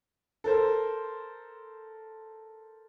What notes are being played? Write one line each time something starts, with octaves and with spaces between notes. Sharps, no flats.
A4 A#4 C5